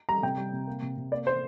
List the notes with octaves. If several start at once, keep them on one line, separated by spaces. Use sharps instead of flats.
G3 A#5
C3 G5
G3
C3
A#3
C3
C3
A#3 D5
A#3 C5